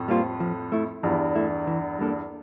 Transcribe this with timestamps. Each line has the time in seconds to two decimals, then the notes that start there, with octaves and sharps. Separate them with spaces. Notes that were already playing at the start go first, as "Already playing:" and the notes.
Already playing: F2 A2
0.08 G3 A#3 F4 C5
0.40 F3
0.72 A3 E4
1.03 E2 G2 F3
1.35 A3 E4
1.67 E3
1.99 G3 A#3 D4 A4